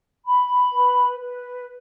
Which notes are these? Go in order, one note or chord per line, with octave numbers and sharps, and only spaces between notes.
B5
B4
B4